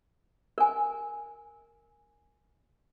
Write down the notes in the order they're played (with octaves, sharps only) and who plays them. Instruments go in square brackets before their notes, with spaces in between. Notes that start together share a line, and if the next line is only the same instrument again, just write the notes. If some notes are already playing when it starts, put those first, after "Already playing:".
[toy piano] A#4 G#5